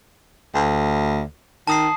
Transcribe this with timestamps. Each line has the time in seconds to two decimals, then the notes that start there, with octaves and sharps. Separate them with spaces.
0.55 D2
1.67 D#3 A5 D#6 C7